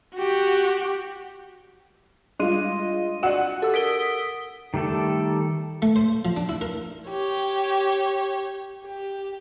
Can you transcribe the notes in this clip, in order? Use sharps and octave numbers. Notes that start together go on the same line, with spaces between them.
F#4 G4
G3 G#3 D4 F4 D#5 C6 D#7
F#4 D5 F#5
G4 A4 E6
A#4 D#6 B6 D7 G7
D#3 G3 A3 A4 D5
A3
C5
F3
D4
E4
A#4
G4 C#5
G4